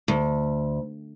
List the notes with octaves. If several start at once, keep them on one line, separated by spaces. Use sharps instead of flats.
D2